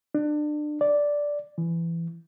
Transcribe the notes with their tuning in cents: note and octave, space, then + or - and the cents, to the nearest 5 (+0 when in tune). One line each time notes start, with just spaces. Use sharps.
D4 +30
D5 -5
E3 +20